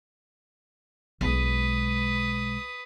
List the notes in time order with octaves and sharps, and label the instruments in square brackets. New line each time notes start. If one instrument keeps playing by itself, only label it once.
[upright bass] B1 G#3 [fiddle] B4 D#6